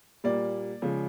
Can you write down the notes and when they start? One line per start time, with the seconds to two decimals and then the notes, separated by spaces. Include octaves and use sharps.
0.24 A#2 G3 A#3 D5
0.82 C#3 F3 G#3